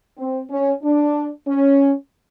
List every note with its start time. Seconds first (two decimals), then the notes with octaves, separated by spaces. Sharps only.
0.18 C4
0.51 C#4
0.83 D4
1.48 C#4